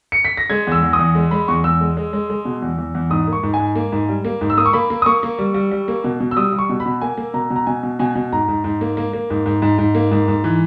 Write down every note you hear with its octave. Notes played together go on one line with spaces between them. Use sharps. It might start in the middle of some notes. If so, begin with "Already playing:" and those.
C#7
B6
A#6
G#3 G#6
E2 E6
E2
D#6
E2
G#3
G#3 B5
E2 C#6
E2 E6
G#3
G#3
G#3
G#3
B2
E2
E2
E2
G#2 D#6
A#3
C#6
G#2
G#5
G#2
A#3
G#2
G3
A#3
G#2
E6
A#3 D#6
C#6
A#3 B5
A#3
D#6
A#3 C#6
A#3
G3
G3
G3
A#3
B2
B2
E6
G3 D#6
G3
C#6
B2
B5
B2
A#3 G#5
A#3
B2 A#5
B2
A#5
B2 G#5
B2
B2 G#5
B2
G#2 A#5
G#2
G#2
A#3
A#3
A#3
G#2
G#2
G#2
G#2
A#3
G#2
G#2
E3